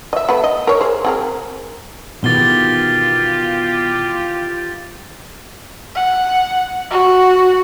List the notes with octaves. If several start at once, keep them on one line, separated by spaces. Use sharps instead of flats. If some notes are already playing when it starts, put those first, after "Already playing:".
D#5 E5
A3 B3 B4
D#5
A#4 C#5
G#4 C5
C4 G#4 A#4
B2 D#3 E3 F4 G4 G#4 A6 G7
F#5
F#4